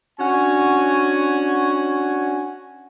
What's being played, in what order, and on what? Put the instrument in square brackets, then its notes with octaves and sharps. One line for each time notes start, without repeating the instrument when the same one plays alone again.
[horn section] C#4 D4 F#4 F#5 G#5